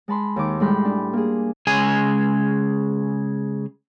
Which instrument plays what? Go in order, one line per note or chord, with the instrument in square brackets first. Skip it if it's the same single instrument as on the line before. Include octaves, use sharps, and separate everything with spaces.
[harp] G#3 A5 B5 C6
D#2 D#3 D6
A2 G3 G#3 B5 C6 G6
D4
A#3 G#4
[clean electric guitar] C#3 G#3 G#4 G#5